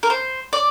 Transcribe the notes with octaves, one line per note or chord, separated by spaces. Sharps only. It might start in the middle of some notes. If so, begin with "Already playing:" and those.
A#4
C5
D5